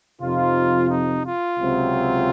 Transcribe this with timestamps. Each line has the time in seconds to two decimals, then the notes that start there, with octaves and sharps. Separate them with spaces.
0.20 F2 C3 F3 C4 D#4 F4
0.89 D#4
1.25 F4
1.59 C#2 C3 F#3 C4